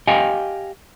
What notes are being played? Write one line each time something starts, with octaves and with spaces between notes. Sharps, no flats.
G4 D#5 F5 G5 G#5